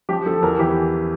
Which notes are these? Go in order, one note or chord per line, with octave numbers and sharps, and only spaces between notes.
F3 G4
F3 A4
E2 A#4
E3 G4